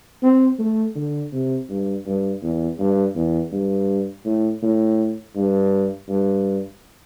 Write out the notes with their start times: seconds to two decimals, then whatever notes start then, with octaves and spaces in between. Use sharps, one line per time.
0.22 C4
0.59 A3
0.96 D3
1.33 C3
1.69 G2
2.06 G2
2.42 E2
2.79 G2
3.15 E2
3.52 G2
4.25 A2
4.62 A2
5.35 G2
6.08 G2